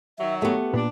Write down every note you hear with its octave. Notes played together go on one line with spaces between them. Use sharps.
D#3 F#3 E5
A3 B3 G4
A#2 B3 D4